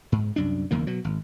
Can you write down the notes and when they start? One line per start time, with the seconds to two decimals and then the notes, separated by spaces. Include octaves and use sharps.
0.12 G#2
0.36 C2 F#2 D4
0.71 F#1 E2 D#3 A#3
0.87 B2 F#3
1.04 G#1